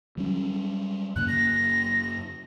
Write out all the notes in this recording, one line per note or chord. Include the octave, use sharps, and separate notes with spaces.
F#3 G3 C#4
F#2 C#3 A#3 F#6
A#6